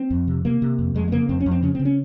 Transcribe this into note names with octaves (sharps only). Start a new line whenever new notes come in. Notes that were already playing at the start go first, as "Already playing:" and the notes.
Already playing: C4
F2
C3
C3 A#3
C3
F2
F2 G#3
G#3
C#3 A#3
F2 C4
C#4
F2
C4
C#3 C#4
C#3 C4
C#4